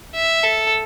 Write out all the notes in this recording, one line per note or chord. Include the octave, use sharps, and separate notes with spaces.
E5
A4